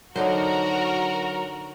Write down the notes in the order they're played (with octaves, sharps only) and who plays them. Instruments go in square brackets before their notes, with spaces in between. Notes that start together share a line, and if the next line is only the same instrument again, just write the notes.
[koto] D3 D#4 C5 [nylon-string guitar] F#3 [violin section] F#4 A#4